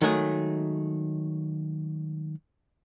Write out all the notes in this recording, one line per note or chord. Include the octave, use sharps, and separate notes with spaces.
D#3 F#3 G#3 A3 G#4